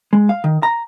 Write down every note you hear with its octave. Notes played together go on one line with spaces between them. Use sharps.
G#3
F5
D#3
A#5